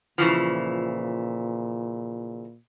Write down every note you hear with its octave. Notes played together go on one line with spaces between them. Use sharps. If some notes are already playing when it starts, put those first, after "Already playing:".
A#2 C#3 E3 F3